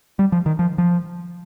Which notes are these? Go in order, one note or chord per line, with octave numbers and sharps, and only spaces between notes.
G3
F3
D#3
F3
F3